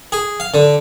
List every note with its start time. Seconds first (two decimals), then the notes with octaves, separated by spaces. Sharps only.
0.12 G#4
0.40 F5
0.54 D3